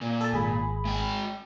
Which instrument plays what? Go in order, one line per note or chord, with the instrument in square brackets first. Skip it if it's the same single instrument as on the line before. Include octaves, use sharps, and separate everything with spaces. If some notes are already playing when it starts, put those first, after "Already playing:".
[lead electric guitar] A#2
[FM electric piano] A4 A5
G#1 G#4 B5
[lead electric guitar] G#3 G5